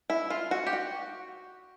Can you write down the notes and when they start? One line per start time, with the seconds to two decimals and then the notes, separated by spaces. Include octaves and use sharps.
0.10 E4
0.30 F4
0.51 F#4
0.67 G4
0.73 F#4